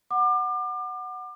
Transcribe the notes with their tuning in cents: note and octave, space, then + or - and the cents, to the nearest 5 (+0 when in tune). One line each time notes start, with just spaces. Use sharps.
F#5 +0 D6 +35